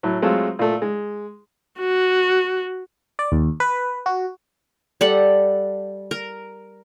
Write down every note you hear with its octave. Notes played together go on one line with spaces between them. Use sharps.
A2 F#3
F#3 G#3 A3 C4 F4 A4
A#2 A3
G#3
F#4
D5
D#2
B4
F#4
G3 A4 F#5
A#4